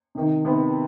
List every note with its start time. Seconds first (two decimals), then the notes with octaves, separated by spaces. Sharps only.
0.15 C3 D#3
0.45 C3 D#3 B3